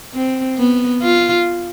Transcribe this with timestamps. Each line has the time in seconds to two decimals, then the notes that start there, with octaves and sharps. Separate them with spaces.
0.14 C4
0.58 B3
1.02 F4